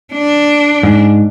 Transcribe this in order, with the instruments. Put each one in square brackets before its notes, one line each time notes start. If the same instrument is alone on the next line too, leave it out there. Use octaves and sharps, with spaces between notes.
[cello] D4
[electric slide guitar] G#2